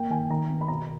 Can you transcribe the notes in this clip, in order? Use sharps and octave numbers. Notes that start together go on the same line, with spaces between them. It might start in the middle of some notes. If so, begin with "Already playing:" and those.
Already playing: A#3 G5
D#3 G#5
D#3 A#5
B3
B5
B2 A#5
A#5